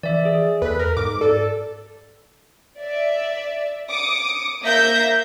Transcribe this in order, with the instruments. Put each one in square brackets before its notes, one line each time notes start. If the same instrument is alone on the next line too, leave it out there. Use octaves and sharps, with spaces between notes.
[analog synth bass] E3 [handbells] D5 E5
[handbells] G#4
[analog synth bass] E2 [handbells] A4 [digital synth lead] B4
[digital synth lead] A#4
[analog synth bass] G#2 [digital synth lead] D6
[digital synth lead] A4 [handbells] D5
[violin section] D5 E5
D6 D#6 C#7
A#3 E5 G6 A#6